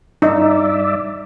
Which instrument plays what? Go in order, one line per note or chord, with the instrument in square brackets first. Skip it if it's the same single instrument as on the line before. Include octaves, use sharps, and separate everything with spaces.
[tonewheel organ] G2 D5 E5 [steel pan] D#4